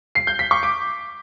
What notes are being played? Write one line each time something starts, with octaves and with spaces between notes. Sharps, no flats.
C7
G6
B6
C#6
D6